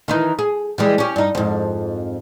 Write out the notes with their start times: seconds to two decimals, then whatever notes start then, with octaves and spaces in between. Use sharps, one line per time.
0.08 D#3 E3 D#4
0.39 G#4
0.78 E3 G3 G#3
0.98 C#4 G4
1.16 G2 D#4
1.35 F2 G#2